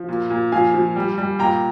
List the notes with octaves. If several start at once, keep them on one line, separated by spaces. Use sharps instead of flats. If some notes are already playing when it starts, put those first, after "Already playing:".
Already playing: F3
A#2
A#2
F3 F5 G#5
F3
G3
G3
A#2 G5 A#5